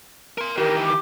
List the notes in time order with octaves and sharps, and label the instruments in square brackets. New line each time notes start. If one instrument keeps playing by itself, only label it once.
[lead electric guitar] A#4 C6
[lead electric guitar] D#3 E3 [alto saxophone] G4 [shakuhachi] A#4
[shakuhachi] D6